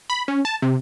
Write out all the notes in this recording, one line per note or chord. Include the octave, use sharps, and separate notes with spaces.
B5
C#4
A5
C3